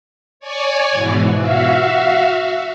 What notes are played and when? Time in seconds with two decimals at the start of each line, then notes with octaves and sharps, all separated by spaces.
0.40 C#5 D5 G#5
0.92 G#2 B2 E3
1.35 F#4 E5 F5